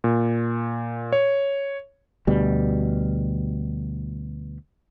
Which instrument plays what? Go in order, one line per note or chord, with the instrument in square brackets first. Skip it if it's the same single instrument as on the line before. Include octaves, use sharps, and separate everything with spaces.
[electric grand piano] A#2
C#5
[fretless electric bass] D2 B2 G3